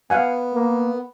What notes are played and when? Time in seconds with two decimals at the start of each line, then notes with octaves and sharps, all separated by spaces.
0.10 B3 F5 F#5 G#5
0.54 A#3